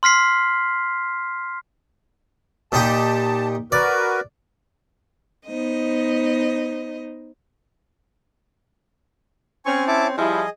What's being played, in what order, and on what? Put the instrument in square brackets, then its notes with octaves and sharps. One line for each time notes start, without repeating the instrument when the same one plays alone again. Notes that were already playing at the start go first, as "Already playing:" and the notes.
[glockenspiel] C6 F6 B6 C7
[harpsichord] A#2 D#4 G4 [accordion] A5
[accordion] F#4 A#4 B4 [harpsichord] D5
[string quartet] B3 D#4 C5 D#5
[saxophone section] C4 C#4 [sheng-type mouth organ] G#5 C#6
[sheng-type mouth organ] E4 A5 D6
[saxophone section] F3 G3 E4 [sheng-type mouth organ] G#4 D#5